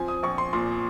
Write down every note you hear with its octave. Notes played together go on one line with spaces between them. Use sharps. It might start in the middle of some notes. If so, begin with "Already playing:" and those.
Already playing: F3 C4 G#5
D#6
A#1 C#6
C6
A#2 C6